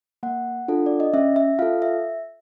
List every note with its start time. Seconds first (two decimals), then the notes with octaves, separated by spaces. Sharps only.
0.23 A#3 F#5
0.68 D4 F4 A4
0.86 D5
1.00 D#5
1.14 C#4 E5
1.36 E5
1.59 F4 A4 F5
1.82 E5